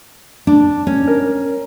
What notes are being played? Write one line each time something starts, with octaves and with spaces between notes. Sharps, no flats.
D4
C#4
A#4